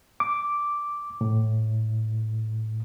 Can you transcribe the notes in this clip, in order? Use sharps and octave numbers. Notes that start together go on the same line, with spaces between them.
D6
A2